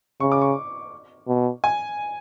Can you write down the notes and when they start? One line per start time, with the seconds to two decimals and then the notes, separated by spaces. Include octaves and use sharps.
0.20 C#3 C#6
0.32 D6
0.42 C#6
1.28 B2
1.64 G#5